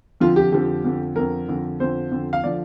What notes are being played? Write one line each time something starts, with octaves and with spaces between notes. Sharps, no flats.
F2 D3 F3 F4
G4
F2 D3 F3 G4
F2 D3 F3
F2 D3 F3 A#4
F2 D3 F3
F2 D3 F3 C5
F2 D3 F3
F5
D3 F3 D5